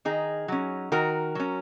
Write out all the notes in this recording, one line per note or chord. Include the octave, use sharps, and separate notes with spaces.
D#3 D#4 G#4
F#3 C#4
D#3 F#4 A#4
F#3 C#4